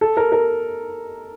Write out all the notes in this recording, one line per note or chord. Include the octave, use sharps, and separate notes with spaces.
A4
A#4
A#4